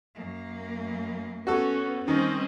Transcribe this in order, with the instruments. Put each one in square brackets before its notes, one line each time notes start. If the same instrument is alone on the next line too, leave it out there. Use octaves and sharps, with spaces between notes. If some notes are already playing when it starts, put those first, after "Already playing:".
[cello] F#2 A#3
[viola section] B3 C#4 [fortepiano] F#4 A4
[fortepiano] D#3 [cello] G3 D#5 [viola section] C4 C#4